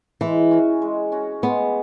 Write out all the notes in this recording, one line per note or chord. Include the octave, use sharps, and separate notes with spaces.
E3 G#3
C#4 F#4
G#3
C#4 F#4
G#3 B3